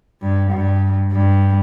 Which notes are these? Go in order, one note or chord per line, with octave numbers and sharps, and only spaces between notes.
G2
G2
G2